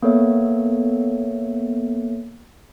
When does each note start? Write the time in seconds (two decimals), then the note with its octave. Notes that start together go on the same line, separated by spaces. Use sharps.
0.03 A#3 B3 A4 C#5 E5